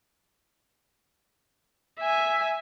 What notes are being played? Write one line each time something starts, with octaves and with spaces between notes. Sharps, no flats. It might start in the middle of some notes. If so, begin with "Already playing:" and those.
E5 G#5